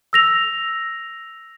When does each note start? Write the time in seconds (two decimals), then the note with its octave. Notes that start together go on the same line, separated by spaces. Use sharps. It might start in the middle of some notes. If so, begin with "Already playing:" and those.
0.13 E6 A#6 F7